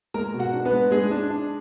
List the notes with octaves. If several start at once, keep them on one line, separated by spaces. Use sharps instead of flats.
G#3 A#4 A#5
B2
F#4 F#5
D4
B3 B4
G#3
G#3 D4 G#4
D4
D4